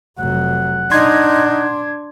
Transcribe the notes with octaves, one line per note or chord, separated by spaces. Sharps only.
F1 F#3 F#5
D4 D#4 C6 G#6